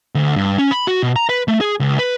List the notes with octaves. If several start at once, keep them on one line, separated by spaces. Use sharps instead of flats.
D2
G2
C#4
B5
F#4
B2
A#5
B4
A3
G#4
C#2
B4